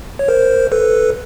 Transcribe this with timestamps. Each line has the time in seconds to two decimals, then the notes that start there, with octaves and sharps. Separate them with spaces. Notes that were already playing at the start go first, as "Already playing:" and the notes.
0.19 C#5
0.28 A#4 C5
0.72 A4 B4